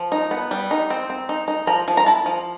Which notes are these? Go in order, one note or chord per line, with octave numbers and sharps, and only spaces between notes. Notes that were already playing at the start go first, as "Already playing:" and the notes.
Already playing: F3
D#4
B3
G3
D#4
C4
C4
D#4
D#4
F3 A#5
F3
A#5
E4 A5
F3